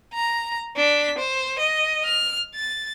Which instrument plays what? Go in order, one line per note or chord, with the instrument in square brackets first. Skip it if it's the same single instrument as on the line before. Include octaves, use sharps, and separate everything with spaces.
[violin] A#5
D4 B6
C5
D#5
F6
A6